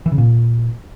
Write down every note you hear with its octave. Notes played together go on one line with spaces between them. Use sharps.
E3
C#3
A#2